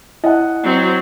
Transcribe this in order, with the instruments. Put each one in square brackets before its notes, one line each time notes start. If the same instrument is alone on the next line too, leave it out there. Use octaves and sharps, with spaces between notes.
[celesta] E4 [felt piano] D#5 F#5
[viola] F#3 C4